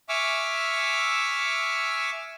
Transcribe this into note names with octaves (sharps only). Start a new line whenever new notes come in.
E5 G#5 C#6 D6 E6 F6